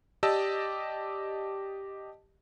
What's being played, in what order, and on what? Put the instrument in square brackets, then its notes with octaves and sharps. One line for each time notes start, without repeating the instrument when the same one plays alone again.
[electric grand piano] G4 D5 D#5 A5 E6